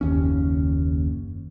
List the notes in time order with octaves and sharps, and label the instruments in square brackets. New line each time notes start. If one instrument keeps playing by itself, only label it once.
[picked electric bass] F#1 D#2 C#4